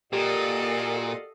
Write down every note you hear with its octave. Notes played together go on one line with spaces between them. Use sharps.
A#2 F#4 G4 A4 A#4 D5 D#5 F5